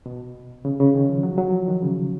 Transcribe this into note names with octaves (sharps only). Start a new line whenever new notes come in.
B2
C#3
C#3
D#3
F3
F#3
F#3
F3
D#3
C#3